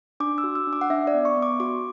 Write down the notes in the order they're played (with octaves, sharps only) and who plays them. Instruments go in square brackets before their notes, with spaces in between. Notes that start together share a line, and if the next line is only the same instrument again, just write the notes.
[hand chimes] D4 D6
E6
F#4
E6
D4
D6
F#5
D4 E5
D5
B3
C#6
B3
D6
F#4 D6